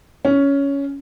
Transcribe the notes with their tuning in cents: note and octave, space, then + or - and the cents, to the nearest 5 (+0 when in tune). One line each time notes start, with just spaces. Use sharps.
C#4 +10